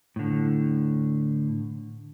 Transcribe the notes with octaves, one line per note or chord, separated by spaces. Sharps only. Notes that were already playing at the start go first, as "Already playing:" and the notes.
A2 D3